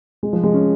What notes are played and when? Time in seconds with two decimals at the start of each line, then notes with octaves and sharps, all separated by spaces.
0.23 G#3
0.33 F3
0.44 G#3
0.54 C#4